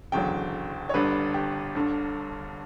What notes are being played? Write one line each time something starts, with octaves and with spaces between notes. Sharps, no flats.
F#1 E2 D3 F#3 G5
C#5
G1 G2 D3 G3 B4
G4
G1 G2 D3